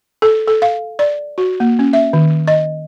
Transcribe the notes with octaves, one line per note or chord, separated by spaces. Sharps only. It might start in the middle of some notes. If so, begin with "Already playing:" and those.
A4
A4
F5
D5
F#4
A#3
C#4
E5
D#3
D#5